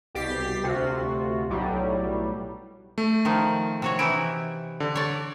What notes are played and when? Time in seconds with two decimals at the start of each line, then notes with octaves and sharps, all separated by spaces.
0.15 C2 B2 G4 A6 B6 C7
0.63 D2 C3 F4 F#4
1.50 B1 A2 F#3 G3
2.98 A3
3.25 D#3 F3 D#4
3.82 C3 F#4 C#5
3.99 E3 D#4 E4 D7
4.80 D3
4.95 C#5 D5